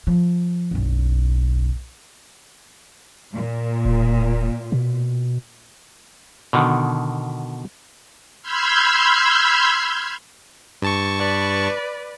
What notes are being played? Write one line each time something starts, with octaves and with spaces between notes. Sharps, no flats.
F3
F#1 B1
A#2
E1
B2
B2 D3 D#3
B5 C6 E6 F6 G6 G#6
G2 A5 C#6
B4 D5